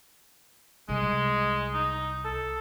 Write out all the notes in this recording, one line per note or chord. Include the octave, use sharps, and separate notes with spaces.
C2 G#3
D#4
A4